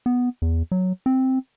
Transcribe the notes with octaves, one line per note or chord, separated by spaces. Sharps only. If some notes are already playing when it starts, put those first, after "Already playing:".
B3
E2
F#3
C4